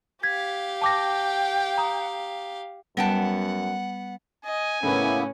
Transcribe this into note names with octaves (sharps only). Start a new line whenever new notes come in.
G4 F5 G#6 B6
G5 A5 D6 A#6
A#5 D#6
F#2 G3 B3 F#5 G5 A5
D#5 G#5
A2 C#3 A#3 B3 C#4 E4 B4